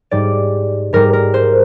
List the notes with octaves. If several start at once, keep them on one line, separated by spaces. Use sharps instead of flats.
G#2 G3 D5
G#2 G3 A#4
A#4
C5